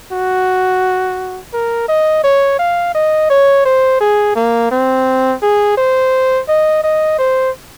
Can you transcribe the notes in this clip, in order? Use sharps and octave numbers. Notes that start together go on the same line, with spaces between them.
F#4
A#4
D#5
C#5
F5
D#5
C#5
C5
G#4
A#3
C4
G#4
C5
D#5
D#5
C5